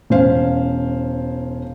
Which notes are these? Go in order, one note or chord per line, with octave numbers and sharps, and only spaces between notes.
E1 C#4 C5 F5